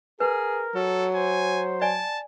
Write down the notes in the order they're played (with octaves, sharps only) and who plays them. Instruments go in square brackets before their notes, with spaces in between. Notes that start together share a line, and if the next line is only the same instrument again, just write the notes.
[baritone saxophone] G#4 [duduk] A#4 [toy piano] B4
[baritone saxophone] F#3 [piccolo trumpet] A4
[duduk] C5 [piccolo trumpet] G#5
[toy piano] D5 G#5 [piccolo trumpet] A5